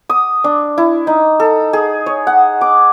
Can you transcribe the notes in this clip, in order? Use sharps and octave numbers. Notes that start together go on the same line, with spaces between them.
D#6
D4
E4
D#4
A4
G#4
C#5
F#5
D6